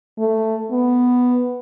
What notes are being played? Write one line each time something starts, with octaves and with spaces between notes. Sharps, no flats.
A3
B3